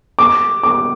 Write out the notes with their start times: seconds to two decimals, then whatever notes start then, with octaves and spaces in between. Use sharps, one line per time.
0.19 D6
0.63 D6